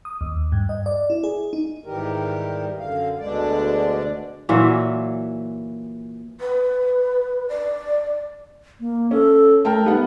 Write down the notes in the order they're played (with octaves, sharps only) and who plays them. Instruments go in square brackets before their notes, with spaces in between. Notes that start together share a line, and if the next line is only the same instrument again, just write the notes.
[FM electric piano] D#6
D#2
G2
D#5
D5
E4
G#4
D#4
[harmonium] G#2 D#3 E3 G3 G4 A#4
F#2 D3 F5
D2 B2 D3 G#3 D4 D5
[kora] A#2 E3 F#3 E5
[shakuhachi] B4
D5
[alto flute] A#3
[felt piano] C#4 [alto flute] A4
[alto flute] A3 [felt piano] A#4 G5 A5
[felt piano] G3 B3 F#5 [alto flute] D#4